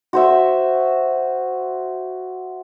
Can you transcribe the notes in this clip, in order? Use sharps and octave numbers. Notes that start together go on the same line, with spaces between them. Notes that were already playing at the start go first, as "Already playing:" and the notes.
F#4 C5 E5